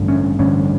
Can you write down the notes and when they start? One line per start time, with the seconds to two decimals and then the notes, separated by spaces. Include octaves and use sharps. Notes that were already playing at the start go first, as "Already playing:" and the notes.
Already playing: A1 G2 D3
0.08 C#4
0.39 A1 G2 D3 C#4